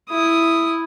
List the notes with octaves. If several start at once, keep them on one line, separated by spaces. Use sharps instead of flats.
E4 D#6